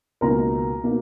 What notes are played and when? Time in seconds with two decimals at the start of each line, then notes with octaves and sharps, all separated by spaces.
0.21 C#2 B2 A#3 D#4 A#4 A#5
0.84 B2 A#3 D#4